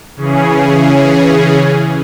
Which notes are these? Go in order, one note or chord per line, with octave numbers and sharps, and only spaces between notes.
C#3 E3 C#4 G#4